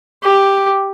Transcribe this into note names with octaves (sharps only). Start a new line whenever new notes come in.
G4